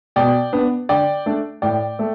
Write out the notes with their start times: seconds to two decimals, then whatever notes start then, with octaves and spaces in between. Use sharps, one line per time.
0.16 B2 D5 G5
0.53 B3 D4
0.89 D3 D5 G5
1.26 A3 D4
1.62 A2 D5 G5
1.99 A3